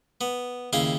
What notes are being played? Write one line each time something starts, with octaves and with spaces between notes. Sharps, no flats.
B3
D#2 C#3 E4 F5 G5